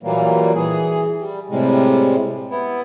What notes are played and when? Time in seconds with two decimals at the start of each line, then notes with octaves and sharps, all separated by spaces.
0.03 A#2 E3 F#3 G3 A#3
0.55 E3 G#4
1.18 G3
1.50 A2 C3 G3 G#3
2.51 B3 E4